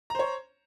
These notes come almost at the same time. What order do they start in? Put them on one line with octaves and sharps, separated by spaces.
A#5 C5 C#5